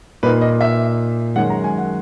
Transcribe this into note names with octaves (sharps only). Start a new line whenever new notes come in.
A#2 A#3 D#4 B4
D#5
E5
F#2 D#3 G#3 C#4 F#5
A#5
G#5
F#5